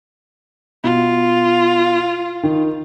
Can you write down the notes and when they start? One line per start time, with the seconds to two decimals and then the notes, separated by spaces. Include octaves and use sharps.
0.84 B2 F4
2.43 D#3